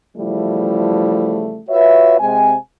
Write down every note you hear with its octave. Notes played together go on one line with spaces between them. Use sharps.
E2 C#3 F3 G3 A3 E4
F4 F#4 B4 C#5 E5
C3 G#3 C4 G#5